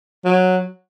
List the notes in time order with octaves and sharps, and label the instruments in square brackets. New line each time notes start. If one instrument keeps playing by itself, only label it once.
[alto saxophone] F#3